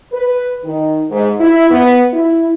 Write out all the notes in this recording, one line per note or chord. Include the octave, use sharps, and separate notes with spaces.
B4
D#3
G#2
E4
B3
E4